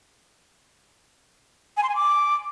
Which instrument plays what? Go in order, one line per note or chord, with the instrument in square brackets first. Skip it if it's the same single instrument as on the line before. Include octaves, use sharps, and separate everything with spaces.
[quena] G#5
C6
G#5
D6